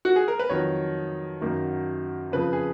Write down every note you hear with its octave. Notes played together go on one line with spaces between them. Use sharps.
F#4
G#4
A#4
B4
F2 D#3 F#3 C#5
F#2 D#3 F#3 A#3
F2 C#3 F3 B4
G#4